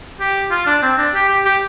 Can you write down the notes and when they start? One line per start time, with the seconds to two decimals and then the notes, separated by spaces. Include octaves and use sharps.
0.20 G4
0.51 F4
0.66 D4
0.82 C4
0.98 D4
1.14 G4
1.29 G4
1.45 G4